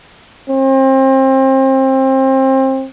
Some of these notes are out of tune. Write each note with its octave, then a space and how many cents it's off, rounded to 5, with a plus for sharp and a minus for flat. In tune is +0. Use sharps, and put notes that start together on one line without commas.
C4 +30